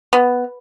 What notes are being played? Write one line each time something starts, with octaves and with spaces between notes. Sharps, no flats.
B3